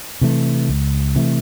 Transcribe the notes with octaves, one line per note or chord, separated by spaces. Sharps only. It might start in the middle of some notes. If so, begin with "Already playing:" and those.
C3 E3 A3
C#2
C3 E3 A3